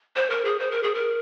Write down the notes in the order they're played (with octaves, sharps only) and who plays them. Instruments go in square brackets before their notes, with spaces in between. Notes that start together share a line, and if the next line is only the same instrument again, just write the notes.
[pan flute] C5
A#4
G#4
C5
A#4
G#4
A#4